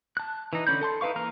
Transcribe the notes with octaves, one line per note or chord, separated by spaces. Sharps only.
A5 F#6
E3 D#4
D3 C#4 B5 G6
A4 A5 C6
D#4 E4 B4 F5 C#6
E3 A#3 A#5 C6 F6